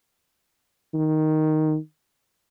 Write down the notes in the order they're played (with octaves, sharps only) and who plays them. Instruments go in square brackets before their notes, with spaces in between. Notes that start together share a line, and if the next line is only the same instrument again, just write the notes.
[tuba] D#3